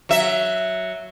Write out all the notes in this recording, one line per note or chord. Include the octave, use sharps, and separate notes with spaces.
F#3 E5